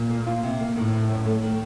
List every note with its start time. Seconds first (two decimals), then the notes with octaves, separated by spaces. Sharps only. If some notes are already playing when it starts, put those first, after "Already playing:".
Already playing: A#2
0.10 A#3
0.26 F4
0.43 C3
0.60 A#3
0.76 A2 D#3
0.93 C3
1.09 F#2
1.26 A3
1.42 D#3